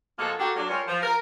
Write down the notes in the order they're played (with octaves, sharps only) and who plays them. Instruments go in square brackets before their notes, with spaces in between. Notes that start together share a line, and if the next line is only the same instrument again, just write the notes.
[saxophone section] A#2 F3 G#3 A#3 F#4 A4
A#3 D4 F#4 G4 A4
F#3 A#3 D4
G3 G#3 F4 A4 A#4 C#5
F3
A#4